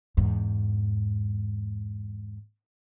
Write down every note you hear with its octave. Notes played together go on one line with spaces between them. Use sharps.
E2 G#2